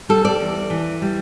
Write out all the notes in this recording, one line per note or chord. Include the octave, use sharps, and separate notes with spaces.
G3 A4
D5
E2
E3
G3